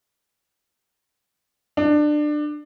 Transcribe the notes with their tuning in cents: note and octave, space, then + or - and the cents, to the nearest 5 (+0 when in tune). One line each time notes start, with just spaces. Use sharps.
D4 +25